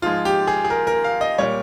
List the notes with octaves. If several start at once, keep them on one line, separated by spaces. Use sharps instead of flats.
G#2 F3 G#3 F4
G4
G#4
G#4
A#4
A#4
F5
D#5
A#2 G3 C#5